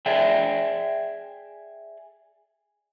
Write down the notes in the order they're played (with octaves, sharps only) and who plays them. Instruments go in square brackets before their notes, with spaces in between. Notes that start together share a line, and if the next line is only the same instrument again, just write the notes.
[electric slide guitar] G#4 D5 E5 G5